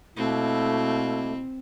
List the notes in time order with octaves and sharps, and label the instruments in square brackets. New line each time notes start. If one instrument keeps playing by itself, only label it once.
[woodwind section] B2 A#3 E4 [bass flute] A3 [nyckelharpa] C4